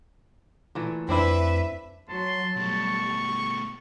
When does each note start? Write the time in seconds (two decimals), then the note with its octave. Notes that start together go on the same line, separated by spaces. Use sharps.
0.75 A#2 E3 A3
1.09 F2 C4 D4 E4 B4 E5
2.09 F#3 A5 C6
2.57 B2 G3 A3 C#6